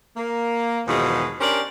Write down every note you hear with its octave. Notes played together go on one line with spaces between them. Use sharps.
A#3
E2 G#2 B2 D#3 F3 G#3
C#4 D4 G4 A#4 C5 D5